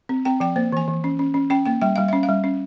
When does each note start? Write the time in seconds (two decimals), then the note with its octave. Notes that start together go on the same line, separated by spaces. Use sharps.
0.09 C4
0.25 C4 G5
0.40 F3 G5
0.56 A#3 C5
0.72 E3 G#5
0.88 E3
1.04 C#4
1.19 C#4
1.34 C#4
1.50 C#4 G5
1.65 A#3 G5
1.81 G3 G5
1.96 G3 F5
2.08 C#4 E5
2.23 F5
2.29 G3
2.44 C#4